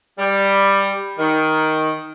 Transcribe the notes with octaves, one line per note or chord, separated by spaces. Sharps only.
G3
D#3